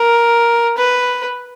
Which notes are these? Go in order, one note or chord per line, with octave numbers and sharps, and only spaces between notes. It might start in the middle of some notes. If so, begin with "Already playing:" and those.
Already playing: A#4
B4